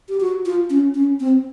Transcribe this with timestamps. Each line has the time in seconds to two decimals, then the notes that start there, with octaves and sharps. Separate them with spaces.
0.09 G4
0.20 F#4
0.46 F4
0.70 C#4
0.94 C#4
1.20 C4